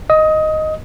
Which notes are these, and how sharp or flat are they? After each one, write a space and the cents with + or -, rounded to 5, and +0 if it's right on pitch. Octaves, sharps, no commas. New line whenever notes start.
D#5 +0 D#6 +25